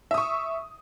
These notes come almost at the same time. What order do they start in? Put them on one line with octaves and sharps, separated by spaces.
E5 D#6 C#6